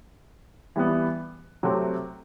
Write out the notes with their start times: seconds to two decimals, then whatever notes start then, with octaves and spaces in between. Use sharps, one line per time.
0.76 E3 G3 B3
1.63 C3 F#3 A3 C4